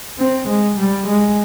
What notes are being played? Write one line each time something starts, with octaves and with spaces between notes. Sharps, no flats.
C4
G#3
G3
G#3